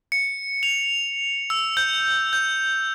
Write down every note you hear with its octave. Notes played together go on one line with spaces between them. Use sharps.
C#7
F7
E6
G6
G6